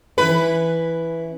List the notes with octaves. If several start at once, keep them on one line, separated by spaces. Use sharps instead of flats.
E3 C#4 E4 B4